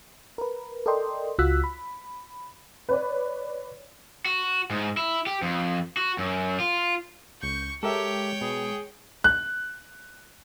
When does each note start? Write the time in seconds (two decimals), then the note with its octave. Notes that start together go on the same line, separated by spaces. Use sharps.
0.38 A#4 B4
0.86 A4 A#4 D5 D#5 G5 C6
1.39 C#2 F4 F#4 E6 F#6 B6
1.64 B5
2.89 B4 C#5 D5
4.26 F#4
4.70 G#2
4.97 E4
5.26 G4
5.42 F2
5.97 F#4
6.18 F#2
6.60 F4
7.42 C#2 C#6 G6
7.83 G#3 G4 A4 A#4 C#5 E5 G5
8.41 B2 G#4
9.24 F#6